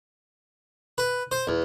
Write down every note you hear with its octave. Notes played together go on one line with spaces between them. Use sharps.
B4
C5
E2